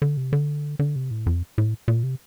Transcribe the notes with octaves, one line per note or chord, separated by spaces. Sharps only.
D3
C3
D3
D3
C3
A2
F2
A2
A#2
C3